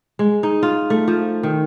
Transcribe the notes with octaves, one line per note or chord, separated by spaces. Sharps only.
G#3
D#4
F4
A3
F3
D#3